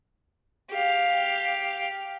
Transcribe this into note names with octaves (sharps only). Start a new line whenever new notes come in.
G4 F5